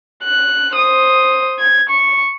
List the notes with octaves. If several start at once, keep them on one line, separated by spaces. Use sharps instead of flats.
F#6
C5 D#6
G#6
C#6